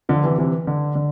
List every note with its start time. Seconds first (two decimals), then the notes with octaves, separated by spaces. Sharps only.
0.09 D3 F3
0.24 C3 E3
0.38 C3 E3
0.67 D3
0.95 D3